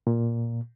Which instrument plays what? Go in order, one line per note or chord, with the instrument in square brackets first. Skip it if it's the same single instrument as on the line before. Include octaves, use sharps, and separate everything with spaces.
[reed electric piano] A#2